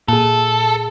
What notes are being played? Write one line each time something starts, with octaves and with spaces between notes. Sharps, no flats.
A#2 G#4 A4